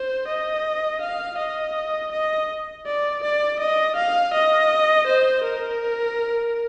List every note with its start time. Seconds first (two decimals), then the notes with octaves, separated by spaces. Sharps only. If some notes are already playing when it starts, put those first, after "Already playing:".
Already playing: C5
0.28 D#5
1.01 F5
1.38 D#5
2.12 D#5
2.86 D5
3.23 D5
3.60 D#5
3.96 F5
4.34 D#5
5.07 C5
5.44 A#4